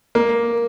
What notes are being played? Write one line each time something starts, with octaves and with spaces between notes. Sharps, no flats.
A#3